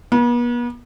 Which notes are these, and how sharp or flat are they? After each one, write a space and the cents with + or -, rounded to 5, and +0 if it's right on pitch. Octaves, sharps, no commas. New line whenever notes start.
B3 -40